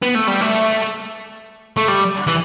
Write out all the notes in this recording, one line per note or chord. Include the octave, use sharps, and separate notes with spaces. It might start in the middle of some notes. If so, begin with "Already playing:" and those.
B3
A3
G3
A3
A3
G3
E3